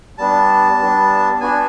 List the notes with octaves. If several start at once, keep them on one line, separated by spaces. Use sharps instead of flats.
G3 B3 D4 A5
G3 B3 D4
B3 D4 F#4 G#5